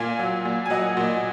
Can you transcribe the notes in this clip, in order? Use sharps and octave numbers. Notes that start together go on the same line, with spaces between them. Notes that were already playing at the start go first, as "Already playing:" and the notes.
Already playing: A#2 F5 G#5
F#3
A#2
G#5
F#3 D#5 F#5
A#2